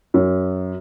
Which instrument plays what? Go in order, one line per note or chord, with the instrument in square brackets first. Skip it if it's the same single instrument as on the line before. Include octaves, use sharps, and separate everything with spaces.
[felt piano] F#2